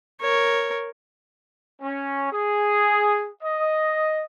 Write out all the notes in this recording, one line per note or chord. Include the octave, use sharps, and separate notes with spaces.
A#4 C#5
C#4
G#4
D#5